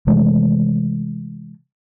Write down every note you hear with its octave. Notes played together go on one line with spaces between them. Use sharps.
C3 E3 G#3 A3